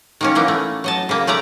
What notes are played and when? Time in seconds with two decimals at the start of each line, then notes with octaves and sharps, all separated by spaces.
0.21 D#3 A#3 C#4
0.35 E3 A#3 B3
0.48 A3
0.84 F#3 D#5 A5
1.09 C#3 A#3
1.27 C#3 A3 D5 A#5